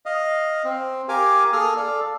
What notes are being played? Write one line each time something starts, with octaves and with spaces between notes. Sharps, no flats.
D#5 F5
C4
G4 A#4 F5 G#5 D6
A#3 G#4 A4 D#6 F6
A4 D5 F5